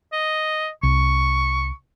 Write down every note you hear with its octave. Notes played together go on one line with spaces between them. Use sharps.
D#5
C2 C#6